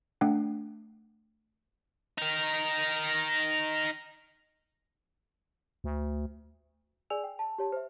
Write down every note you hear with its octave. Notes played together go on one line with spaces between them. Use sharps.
A3 D4 F#5 G5
D#4 A#4
D2
G#4 D5 G#5 E6 F7
G5
A5
G4 C#5 A5
C5 E5